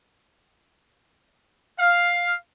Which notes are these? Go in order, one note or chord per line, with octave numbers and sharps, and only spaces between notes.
F5